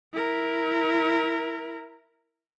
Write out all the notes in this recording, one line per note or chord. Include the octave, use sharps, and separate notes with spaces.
E4 A#4